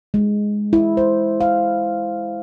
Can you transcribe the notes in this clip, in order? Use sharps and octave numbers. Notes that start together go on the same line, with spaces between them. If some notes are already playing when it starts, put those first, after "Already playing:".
G#3
E4
C5
F5